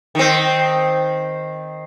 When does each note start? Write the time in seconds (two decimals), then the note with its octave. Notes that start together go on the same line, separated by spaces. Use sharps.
0.15 D#3 C4